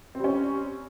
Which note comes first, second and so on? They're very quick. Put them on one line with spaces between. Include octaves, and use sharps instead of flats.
C4 G3 C#4